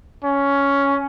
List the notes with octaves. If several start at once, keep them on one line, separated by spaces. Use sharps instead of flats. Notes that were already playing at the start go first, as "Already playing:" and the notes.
C#4